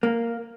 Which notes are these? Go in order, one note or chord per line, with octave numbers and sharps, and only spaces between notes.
A#3